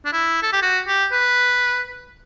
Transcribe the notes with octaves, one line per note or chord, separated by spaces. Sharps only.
D4
E4
A4
G4
F#4
G4
B4